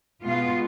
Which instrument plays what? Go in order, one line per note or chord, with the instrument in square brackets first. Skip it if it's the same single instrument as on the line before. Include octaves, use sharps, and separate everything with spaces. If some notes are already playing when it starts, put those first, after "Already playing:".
[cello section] B2 G#3 B3 F4